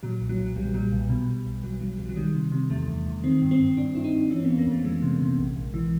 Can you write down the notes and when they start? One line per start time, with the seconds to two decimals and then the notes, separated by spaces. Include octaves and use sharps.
0.03 A#2 F#3
0.20 B1
0.29 F#3
0.39 B1
0.56 B1 G3
0.65 F#3
0.74 A#2 G3
0.92 B1
1.10 B2
1.28 B2
1.45 B1
1.63 B1 F#3
1.81 B1 F#3
1.98 B1 F#3
2.09 F#3
2.16 D#3 G3
2.35 C3
2.52 C3
2.70 E2 A3
2.88 E2
3.06 E2
3.24 D#3 C4
3.42 G2
3.51 C4
3.59 G2
3.77 G2 D4
3.95 G2 E4
4.04 D#4
4.13 G2
4.31 E3 C#4
4.40 C4
4.45 F2 B3
4.58 A#3
4.67 F2 A3
4.84 E3 G#3
5.02 C3
5.20 C3
5.38 A#1
5.56 A#1
5.74 E3